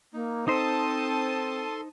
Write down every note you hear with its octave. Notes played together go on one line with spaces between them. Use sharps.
A#3 D#4
C4 D#4 A4 C5 A5 C6 D#6